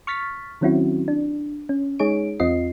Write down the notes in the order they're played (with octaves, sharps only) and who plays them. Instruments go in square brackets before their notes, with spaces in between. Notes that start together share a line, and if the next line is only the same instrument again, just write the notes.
[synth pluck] C#6 F6 A6 B6
D#3 F#3 C4 C#4 E4 F#4
D4
C#4
G#3 D#4 G#4 C#5 D7
E2 C4 F4 D#5 C7